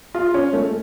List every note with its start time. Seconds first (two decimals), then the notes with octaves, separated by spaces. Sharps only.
0.14 F4
0.34 C#4
0.53 A3